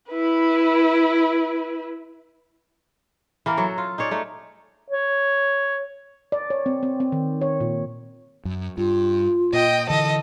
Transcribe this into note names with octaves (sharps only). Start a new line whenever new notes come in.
E4 B4
E3 A#3 A#4
F#3 F#4 A4
F4
D#4 G#4 C#5 D5
A3 D#4
C#5
D5
C#5
C4
C4
C4
D#3
C#5
A#2
F#2
G2 F4
A#2 D#5 G5
D3 E3 A4 D#5